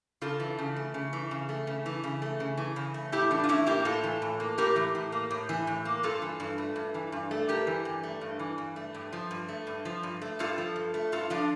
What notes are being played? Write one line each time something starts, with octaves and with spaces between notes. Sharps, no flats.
C#3 F4 A4
E3
C#3
A3
C#3
E3
C#3
A3
C#3
E3
C#3
A3
C#3
E3
C#3
A3
A2 E4 G4
E3 D4
F4
A2 C#4 E4
A#3 E4 G4
A2 F4 A4
E3
A2
A#3
A2 G4 A#4
E3
A2
A#3
A2
E3
A2
A#3
G2 F4 A4
E3
G2
A3
G2
E3
G2
A3
G2 G4 A#4
E3
G2
A3
G2
E3
G2
A3
G2
F3
G2
A3
G2
F3
G2
A3
G2 F4 A4
F3
G2
A3
G2 F4 A4
F3 D4 F4